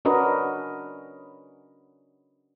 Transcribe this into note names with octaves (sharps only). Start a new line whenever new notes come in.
C#4 D4 F#4 A#4 B4 D#5